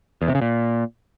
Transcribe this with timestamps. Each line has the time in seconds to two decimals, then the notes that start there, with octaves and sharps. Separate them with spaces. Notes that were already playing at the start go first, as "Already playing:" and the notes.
0.22 E2
0.28 C3
0.35 C#3
0.42 A#2